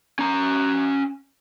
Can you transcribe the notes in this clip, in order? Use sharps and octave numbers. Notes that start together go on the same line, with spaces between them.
C#4 A#5